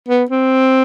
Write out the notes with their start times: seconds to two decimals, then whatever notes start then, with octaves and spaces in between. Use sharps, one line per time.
0.09 B3
0.30 C4